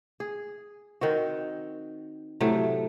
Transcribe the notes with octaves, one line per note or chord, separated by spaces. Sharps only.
G#4
D#3 C4 F#4
A2 C3 F#3 A3